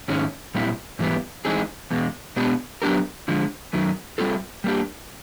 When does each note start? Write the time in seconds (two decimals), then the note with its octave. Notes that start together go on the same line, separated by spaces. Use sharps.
0.08 G#2 D#3 G#3 C#4
0.54 A#2 G3 C4 E4
0.99 G#2 E3 G3 B3
1.45 E3 G#3 C4 D#4 G#4
1.90 E2 B2 G#3
2.36 B2 G#3 B3 D4 G4
2.82 F#3 B3 D4 G4 A#4
3.28 D3 F3 G#3
3.73 F#2 D#3 F#3
4.18 G3 C4 F4 A4
4.64 G3 A#3 D4 G4